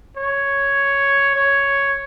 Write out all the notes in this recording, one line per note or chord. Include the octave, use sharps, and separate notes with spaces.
C#5
C#5